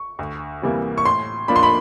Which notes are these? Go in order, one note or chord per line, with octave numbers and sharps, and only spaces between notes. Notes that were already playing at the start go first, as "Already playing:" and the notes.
Already playing: C#6
D2
C3 E3 G3 A#3
C#6
A2 C6
F3 A#3 D4 B5
C6
B5